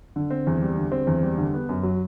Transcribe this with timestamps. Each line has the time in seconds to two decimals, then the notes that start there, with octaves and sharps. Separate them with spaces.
0.16 D3
0.30 C4
0.47 E2
0.62 G3
0.77 D3
0.92 C4
1.07 E2
1.23 G3
1.38 D3
1.54 B3
1.69 F#2
1.83 F#3